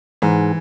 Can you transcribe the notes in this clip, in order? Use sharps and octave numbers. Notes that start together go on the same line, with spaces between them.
G#2 E3